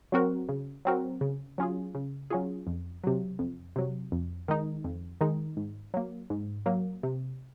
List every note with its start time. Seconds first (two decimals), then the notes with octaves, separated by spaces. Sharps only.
0.12 F#3 C4 F#4 A#4
0.49 C#3
0.85 F#3 C4 F#4 A#4
1.21 C#3
1.58 F#3 C#4 F4 G#4
1.95 C#3
2.30 F#3 C#4 F4 G#4
2.67 F2
3.04 C3 F#3
3.39 F2
3.76 C3 F#3
4.12 F2
4.48 D#3 G#3 D#4
4.84 F2
5.21 D#3 G#3 D#4
5.57 G#2
5.94 F#3 A#3
6.30 G#2
6.66 F#3 A#3
7.03 C3